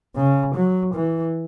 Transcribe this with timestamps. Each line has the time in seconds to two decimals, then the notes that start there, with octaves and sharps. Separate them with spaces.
0.16 C#3
0.55 F#3
0.95 E3